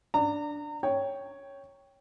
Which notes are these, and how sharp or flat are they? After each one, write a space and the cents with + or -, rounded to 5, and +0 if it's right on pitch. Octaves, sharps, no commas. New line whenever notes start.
D4 +0 A#5 -35
C#5 +0 G5 +0